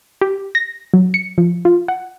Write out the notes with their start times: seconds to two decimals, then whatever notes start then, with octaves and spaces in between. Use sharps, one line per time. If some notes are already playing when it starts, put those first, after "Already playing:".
0.21 G4
0.55 A#6
0.94 F#3
1.14 C#7
1.38 F3
1.65 F4
1.88 F#5